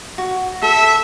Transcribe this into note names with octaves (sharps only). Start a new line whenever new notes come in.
F#4
A4 E5